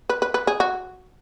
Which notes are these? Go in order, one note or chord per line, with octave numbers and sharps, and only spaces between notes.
B4
B4
B4
G#4
F#4